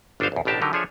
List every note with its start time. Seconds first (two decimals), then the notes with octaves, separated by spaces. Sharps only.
0.20 G1 D4 F#4 B4 C5 F5
0.32 B1 E2
0.45 A1 B2 D4 G4 A#4 A5
0.61 D3 F#3 D#4 G4 A#4
0.73 F3 D4 G#4 A4 C#5 E5